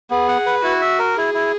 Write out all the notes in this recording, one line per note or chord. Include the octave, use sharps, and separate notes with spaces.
B3 G#4
F#5
B4
E4 F#4
E5
A#4
E4 G#4
E4